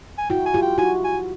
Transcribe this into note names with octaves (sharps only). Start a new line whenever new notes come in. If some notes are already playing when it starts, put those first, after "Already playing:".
G#5
E4 F#4 G5
G#5
F4 G4
G5
E4 F#4 G#5
G#5